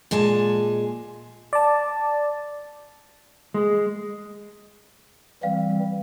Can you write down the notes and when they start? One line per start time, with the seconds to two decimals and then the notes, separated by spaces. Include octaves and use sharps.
0.11 A#2 G#3 G#5 A5
1.53 D5 A5
3.54 G#3
5.43 E3 G3 C4 F5